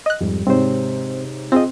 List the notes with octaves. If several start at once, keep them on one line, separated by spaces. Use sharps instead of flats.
D#5 F#6
F2 G#2 G3
G#2 C3 C4 C5 C#5
C4 F4 G#4 D#5